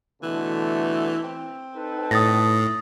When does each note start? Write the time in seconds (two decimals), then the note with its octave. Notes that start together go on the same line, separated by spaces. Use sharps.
0.23 B2 D3 E3 A3
1.24 C4
1.76 D#4 A4 B4
2.11 A2 D#6 A6 A#6